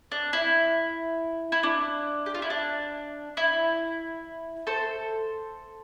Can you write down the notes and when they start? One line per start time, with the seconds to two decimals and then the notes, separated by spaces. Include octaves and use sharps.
0.12 D4
0.33 E4
1.52 E4
1.63 D4
2.26 G4
2.34 F4
2.42 E4
2.50 D4
3.37 E4
4.67 A4 C5